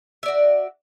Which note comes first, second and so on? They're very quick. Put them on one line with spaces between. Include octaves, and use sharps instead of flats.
E5 D5 F#4